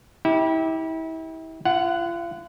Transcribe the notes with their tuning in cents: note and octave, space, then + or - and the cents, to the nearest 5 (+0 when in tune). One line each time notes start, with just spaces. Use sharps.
E4 -35 G4 +0
F4 -40 F#5 +0